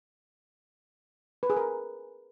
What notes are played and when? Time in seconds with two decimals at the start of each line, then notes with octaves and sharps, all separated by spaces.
1.43 B4
1.50 G#4
1.57 A#4